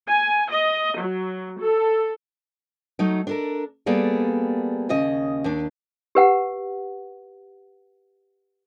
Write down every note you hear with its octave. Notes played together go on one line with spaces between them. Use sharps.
G#5
D#5
F#3
A4
F#3 A3 D#4
D4 A4 A#4
G3 A#3 B3 G#4 A4 D5
D#2 C#3 D#5
D#2 D4
G4 B4 F#5